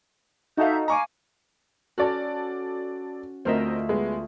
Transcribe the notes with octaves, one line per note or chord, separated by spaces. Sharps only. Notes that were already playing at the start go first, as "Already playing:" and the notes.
D#4 F#4 A4 E5 F5 G6
F5 G#5 A#5 C#6 D6
C#4 F#4 A4 D5 A5
D2 C4 F4 A#4 D#5 E5
G#3 B3